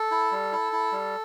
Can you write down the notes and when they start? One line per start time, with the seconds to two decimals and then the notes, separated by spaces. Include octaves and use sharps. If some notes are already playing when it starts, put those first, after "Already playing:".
Already playing: A4
0.11 E4
0.32 G3
0.52 E4
0.73 E4
0.92 G3